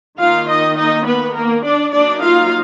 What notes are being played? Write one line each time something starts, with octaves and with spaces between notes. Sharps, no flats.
D#3 A#3 D#4 F4 F5
D#4 D#5
D#4 D#5
B3 B4
A#3 A#4
D4 D5
F#3 A#3 D4 D#4 D5
F4 F5